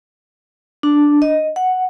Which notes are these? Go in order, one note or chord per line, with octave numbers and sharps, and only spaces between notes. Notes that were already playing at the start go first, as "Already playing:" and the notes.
D4
D#5
F#5